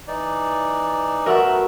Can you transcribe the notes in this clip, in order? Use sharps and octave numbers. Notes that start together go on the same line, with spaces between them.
E3 D#4 D5
F#3 A3 B3 A#4 E5 F#5